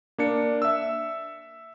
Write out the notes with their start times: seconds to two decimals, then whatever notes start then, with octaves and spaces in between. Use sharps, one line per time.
0.18 A#3 D4 C#7
0.62 E5 E6